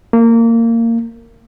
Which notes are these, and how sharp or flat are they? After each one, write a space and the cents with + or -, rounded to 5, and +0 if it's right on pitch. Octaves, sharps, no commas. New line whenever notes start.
A#3 -20